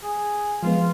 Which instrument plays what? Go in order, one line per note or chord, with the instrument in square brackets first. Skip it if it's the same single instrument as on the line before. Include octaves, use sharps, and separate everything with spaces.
[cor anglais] G#4
[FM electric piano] F3 G#3 B3 [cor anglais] F4